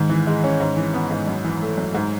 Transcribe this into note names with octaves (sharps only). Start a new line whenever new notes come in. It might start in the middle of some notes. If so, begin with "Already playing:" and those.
Already playing: G#2 D#3
E3
G#3
C#4
G#2
E3
B3
G#2
F#2
E3
A3
F#2
G#2